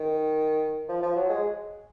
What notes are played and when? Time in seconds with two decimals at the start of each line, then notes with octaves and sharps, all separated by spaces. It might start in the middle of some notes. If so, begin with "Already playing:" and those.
Already playing: D#3
0.88 F3
1.02 F3
1.16 F#3
1.29 G#3